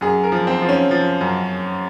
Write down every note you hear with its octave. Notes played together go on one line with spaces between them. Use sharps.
F#2 G#4
A#4
F3
C4
F3
C#4
F3
F#2